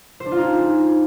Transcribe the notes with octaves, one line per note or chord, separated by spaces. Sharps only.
C5
D4
F4
D#4
G#4